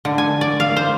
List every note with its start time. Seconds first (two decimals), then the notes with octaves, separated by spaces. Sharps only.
0.05 D3
0.18 G#5
0.41 D5
0.60 F5
0.77 C5